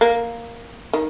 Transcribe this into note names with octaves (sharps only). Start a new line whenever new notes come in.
A#3
D#3